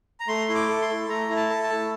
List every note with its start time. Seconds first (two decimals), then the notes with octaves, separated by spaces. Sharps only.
0.20 A#5
0.28 A3 C6
0.49 E4
0.55 D6
0.69 A4
0.82 C6
0.89 A3
1.09 A3 A#5
1.29 E4
1.36 A5
1.50 A4
1.63 A5
1.69 A3